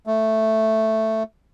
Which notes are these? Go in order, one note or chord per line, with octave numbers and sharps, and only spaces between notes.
A3